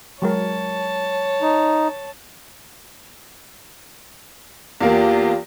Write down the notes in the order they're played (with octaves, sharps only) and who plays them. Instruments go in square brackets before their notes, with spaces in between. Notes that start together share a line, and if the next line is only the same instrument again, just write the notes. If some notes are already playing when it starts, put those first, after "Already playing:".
[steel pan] F#3 G#3 A#4 [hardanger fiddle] C#5 A5
[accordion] D#4
[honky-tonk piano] E2 A#3 [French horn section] F4 G4